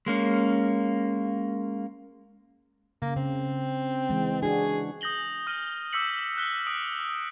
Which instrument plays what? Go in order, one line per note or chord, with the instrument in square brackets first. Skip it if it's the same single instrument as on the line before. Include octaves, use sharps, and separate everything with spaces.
[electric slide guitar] G#3 A#3 C#4
[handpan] C#3 [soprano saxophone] A#3
[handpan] C#3 [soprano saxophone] C4
[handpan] E3 G#3
[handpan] D4 F#4 [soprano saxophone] G#4
[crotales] D#6 G6 A#6 F#7 G7
D#6 F6 A#6 D#7 F#7
D6 E6 G6 B6 C#7 F#7
F#6 B6 G7
D#6 D7 F#7